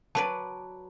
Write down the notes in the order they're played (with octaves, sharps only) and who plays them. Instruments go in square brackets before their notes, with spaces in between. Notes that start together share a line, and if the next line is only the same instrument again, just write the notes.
[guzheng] F#3 B4 D5 [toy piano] A5